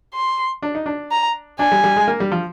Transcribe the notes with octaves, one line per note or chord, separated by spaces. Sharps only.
C6
D4
D#4
D4
A#5
D4 G#5
G3
G3
G#3
A#3
G3
F3